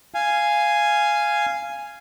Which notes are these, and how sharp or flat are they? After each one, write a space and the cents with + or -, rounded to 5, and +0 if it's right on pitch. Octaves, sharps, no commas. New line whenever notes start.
F5 -10 G#5 +0